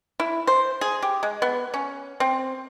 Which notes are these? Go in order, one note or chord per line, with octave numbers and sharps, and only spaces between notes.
E4
C5
G#4
G4
G#3
B3
C#4
C4